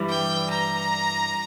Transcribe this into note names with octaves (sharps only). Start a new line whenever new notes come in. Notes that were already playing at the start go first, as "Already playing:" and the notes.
Already playing: G2 E3 G3
G5
A#5